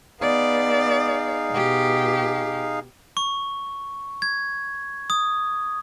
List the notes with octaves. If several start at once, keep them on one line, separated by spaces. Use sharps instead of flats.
B3 D#4 G#4 D5 F5
B2 G4
C#6
G#6
D#6